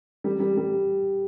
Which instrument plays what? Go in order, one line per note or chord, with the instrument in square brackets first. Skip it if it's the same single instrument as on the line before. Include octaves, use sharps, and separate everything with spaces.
[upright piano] G3
G3
G3